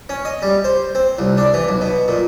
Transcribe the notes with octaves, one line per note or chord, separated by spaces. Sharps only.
C#4
D#5
G3
C5
C4
C2
D4
E3
B1
B2
A#2